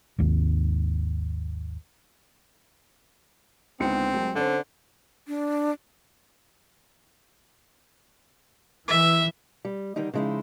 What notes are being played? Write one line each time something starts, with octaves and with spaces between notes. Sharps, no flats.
G#1 D#2
C#2 D3 G#3 B3 C4 D#4 C#7
A#2 F#3 G#3 A3
D3 C4 C#4 A4 C5 D5
D4
E3 E5
G3
D3 D#3 G3 D#4
C#3 F3 G#3 D#4 E4